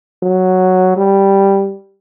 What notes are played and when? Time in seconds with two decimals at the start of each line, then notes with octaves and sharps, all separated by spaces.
0.23 F#3
0.97 G3